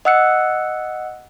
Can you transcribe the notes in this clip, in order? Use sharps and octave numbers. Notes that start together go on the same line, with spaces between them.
D#5 F#5 E6 F#6 C#7